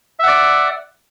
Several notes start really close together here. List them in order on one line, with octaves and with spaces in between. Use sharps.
E5 F#5 D5